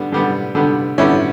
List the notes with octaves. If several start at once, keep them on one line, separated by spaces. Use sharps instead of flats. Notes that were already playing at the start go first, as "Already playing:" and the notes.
Already playing: D3 G3 B3
D3 G3 B3
D3 G3 B3
D3 G3 B3 C#4 E4